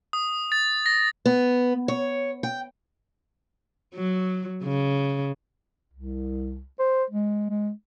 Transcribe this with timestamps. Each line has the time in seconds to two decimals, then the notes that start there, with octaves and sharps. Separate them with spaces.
0.13 D#6
0.52 A6
0.86 A#6
1.26 B3
1.88 C#5
2.43 G5
3.94 F#3
4.64 C#3
5.93 C2
6.79 C5
7.10 G#3
7.50 G#3